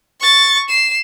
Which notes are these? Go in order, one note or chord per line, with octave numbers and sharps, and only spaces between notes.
C#6 A6
C7 E7